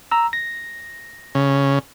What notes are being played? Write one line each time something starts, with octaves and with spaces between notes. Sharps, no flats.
A#5 E6
A#6
C#3